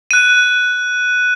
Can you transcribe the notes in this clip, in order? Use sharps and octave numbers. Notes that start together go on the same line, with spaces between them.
F#6 D#7